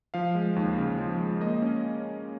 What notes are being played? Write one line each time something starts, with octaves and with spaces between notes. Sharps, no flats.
F3 F5
G#3
D#2
C#3
F3
G#3
A#3 D#5
C#4